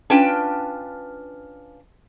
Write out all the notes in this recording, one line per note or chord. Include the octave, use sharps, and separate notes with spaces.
C#4 D4 F4 B4 G5 A5